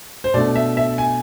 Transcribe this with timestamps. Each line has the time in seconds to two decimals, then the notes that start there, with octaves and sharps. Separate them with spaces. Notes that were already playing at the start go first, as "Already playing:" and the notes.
0.24 C5
0.34 B2 A3 D4 D5
0.56 E5
0.77 E5
0.98 G#5